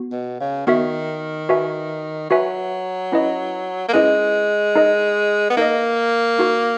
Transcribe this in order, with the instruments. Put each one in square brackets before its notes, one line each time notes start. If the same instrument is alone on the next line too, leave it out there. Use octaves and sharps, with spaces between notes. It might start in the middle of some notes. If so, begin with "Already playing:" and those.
Already playing: [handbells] B3 F#4
[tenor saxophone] B2
C#3
[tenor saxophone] D#3 [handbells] B3 F#4 A#4 E5
[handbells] F#4 B4 E5 G#5
[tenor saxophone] F#3 [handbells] F#4 B4 E5 G#5
[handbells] C#4 E4 B4 D#5
[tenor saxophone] A#3
[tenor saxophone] G#3 [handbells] C#4 E4 B4 D#5
[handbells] D#4 A#4 D#5
[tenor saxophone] B3
[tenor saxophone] A#3 [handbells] D#4 A#4 D#5
[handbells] D#4 F#4 A#4